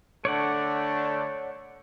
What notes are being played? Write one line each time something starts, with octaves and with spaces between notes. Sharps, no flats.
D3 A3 D4 C#5 D5 F#5